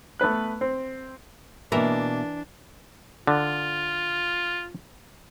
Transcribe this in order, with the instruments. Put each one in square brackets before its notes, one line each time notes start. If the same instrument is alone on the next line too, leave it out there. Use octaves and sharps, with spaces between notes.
[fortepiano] A3 B3 B4 F#6
C4
[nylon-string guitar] B2 A#3 E5 [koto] E3 A#4 [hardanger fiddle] D4
[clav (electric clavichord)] D3 [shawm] F4